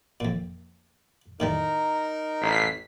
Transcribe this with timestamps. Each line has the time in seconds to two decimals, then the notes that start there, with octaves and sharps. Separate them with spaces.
0.20 F2 A#2
1.40 A2 D#3 G3 D#4 A#4
2.41 A1 B6 C7